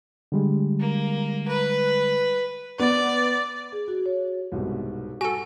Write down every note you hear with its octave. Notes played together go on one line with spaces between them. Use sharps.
D3 G3 G#3
A#3
B4
B3 D5
G#4
F#4
C#5
C2 G#2 B2
F#4 A4 G#5